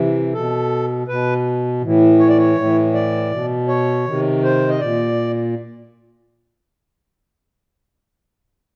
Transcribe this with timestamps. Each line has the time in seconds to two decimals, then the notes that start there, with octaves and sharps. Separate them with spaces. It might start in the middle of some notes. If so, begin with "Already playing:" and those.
Already playing: C3 E3
0.33 B2 A4
1.08 B2 B4
1.82 A2 E3
2.19 C#5
2.28 D5
2.38 C#5
2.57 A2 E3
2.94 D5
3.31 B2
3.68 C#5
4.06 C3 D#3
4.43 C5
4.69 D#5
4.80 A#2 D5